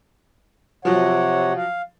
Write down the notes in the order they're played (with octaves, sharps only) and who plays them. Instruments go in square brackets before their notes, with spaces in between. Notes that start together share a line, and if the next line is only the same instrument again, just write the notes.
[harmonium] C3 C#5 F#5 [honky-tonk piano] F3 F#3
[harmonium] F5